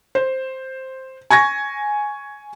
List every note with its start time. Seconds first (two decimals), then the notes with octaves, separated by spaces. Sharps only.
0.15 C5
1.30 G#5 C#6 G#6 A#6